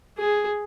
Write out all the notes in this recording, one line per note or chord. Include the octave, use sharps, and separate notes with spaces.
G#4